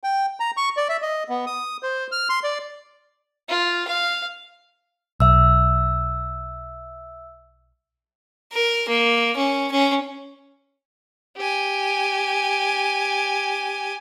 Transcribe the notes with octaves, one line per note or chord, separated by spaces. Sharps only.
G5
A#5
C#6
D5
E5
D#5
B3
D#6
C5
F6
C6
D5
F4
F5
B1 E5 E6
A#4
A#3
C#4
C#4
G4 G#5